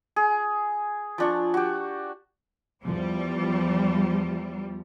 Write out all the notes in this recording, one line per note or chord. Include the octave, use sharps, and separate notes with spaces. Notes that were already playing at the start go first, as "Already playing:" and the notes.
G#4
F3 D4 C#6
F#4 G4
E2 F3 G3